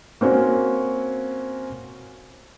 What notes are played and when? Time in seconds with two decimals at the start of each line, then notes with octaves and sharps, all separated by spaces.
0.21 A#3 C4 C#4 F#4